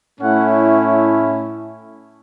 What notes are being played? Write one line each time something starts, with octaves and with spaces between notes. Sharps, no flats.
A2 A3 C#4 E4 F#5